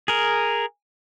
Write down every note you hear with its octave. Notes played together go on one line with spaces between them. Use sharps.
G#4 A#4